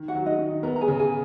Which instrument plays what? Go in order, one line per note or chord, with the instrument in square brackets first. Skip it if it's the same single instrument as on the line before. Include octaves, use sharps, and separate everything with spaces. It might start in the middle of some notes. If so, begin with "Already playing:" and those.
Already playing: [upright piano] D#3
[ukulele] F#4 F#5
[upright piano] F#3
[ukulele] D#4 D#5
[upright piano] D#3
[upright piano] B3 [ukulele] A#4 A#5
[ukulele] A#5
G#4 G#5
[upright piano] C#3
[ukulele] G#4 G#5